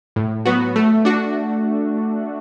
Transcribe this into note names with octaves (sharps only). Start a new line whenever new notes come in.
A2
F#3 B3 F#4
A3
D4 F#4